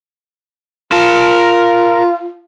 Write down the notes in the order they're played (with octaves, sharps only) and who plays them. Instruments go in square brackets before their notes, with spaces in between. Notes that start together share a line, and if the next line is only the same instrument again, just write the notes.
[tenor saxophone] F4 [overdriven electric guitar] A#4 A5